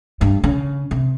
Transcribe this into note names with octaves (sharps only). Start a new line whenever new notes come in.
G2
C#3
C3